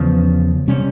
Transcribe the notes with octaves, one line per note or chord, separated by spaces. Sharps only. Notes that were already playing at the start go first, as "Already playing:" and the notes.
Already playing: E2 C#3 F3
C3 G3 C#4